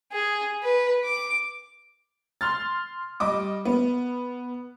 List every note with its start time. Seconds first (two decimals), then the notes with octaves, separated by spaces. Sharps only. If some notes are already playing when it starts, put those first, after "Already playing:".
0.12 G#4
0.63 B4
1.05 D6
2.41 C6 F6 A6
3.20 G3 D#5 D6
3.65 B3